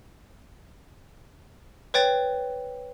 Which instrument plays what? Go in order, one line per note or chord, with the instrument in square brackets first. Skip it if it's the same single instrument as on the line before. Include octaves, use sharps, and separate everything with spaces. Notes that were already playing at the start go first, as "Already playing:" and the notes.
[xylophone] B4 C#5 G5 A6